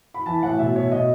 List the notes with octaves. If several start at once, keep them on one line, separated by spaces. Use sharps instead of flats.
B5
E3 A5
A2 F#5
B2 E5
B2 C#5
B2 D#5